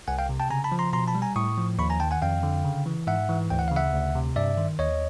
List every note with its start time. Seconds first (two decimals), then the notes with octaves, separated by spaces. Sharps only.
0.08 C2 F#5 G#5
0.19 F5 G5
0.29 C3
0.40 G5 A5
0.50 C#3 G#5 A#5
0.64 A5 B5
0.72 F3
0.79 A#5 C6
0.93 B2 A#5 C6
1.07 A5 B5
1.15 G3
1.22 G#5 A#5
1.36 A2 C#6 D#6
1.58 F3
1.78 D#2 B5 C#6
1.90 G#5 A#5
2.00 D#3 G5 A5
2.11 F#5 G#5
2.22 F2 F5 G5
2.43 D3
2.65 C#3
2.86 E3
3.07 G#2 E5 F#5
3.29 E3
3.50 D2 G5
3.59 F#5
3.68 F5
3.72 C#3 E5 F#5
3.93 D2
4.15 C3
4.36 G2 D5 E5
4.57 D#3
4.79 D#2 C#5 D#5